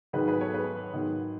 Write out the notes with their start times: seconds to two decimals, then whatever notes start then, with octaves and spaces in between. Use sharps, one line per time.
0.13 G#2 D#3 F#3 G#4 B4
0.28 G#4 B4
0.41 A4 C#5
0.54 G#4 B4
0.93 G#2 D#3 F#3